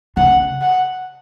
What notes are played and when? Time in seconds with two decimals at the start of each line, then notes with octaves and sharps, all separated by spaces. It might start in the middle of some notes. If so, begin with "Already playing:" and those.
0.17 C#3 F#5
0.61 F#5